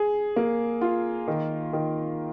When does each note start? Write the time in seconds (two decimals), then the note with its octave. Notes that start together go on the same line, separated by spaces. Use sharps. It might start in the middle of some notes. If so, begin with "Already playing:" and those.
Already playing: G#4
0.36 A#3
0.81 F4
1.28 D#3
1.73 D#3